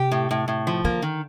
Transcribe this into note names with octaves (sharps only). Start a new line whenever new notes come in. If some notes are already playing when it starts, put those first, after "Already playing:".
Already playing: C3 G4
A2
A2
A2
F3
D3 A#3
D#3